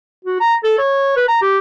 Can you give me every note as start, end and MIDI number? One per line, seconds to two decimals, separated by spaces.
0.25 0.40 66
0.40 0.55 82
0.64 0.76 69
0.78 1.12 73
1.16 1.26 71
1.28 1.42 82
1.42 1.59 67